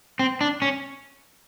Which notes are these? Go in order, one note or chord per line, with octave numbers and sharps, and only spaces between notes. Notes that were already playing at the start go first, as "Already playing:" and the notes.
C4
D4
C#4